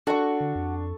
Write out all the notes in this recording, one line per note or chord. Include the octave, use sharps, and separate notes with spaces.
D4 F#4 A4 C#6
D3
F2